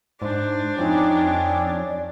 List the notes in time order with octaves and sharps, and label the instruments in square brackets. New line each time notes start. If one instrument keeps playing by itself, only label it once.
[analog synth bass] G#2 [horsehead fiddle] D4 [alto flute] C5
[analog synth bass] F2 [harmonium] C4 C#4 C#5 [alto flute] D#4
[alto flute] D5